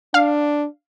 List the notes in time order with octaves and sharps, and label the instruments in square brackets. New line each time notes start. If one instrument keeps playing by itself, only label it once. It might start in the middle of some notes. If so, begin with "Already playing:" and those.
[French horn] D4 [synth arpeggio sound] F5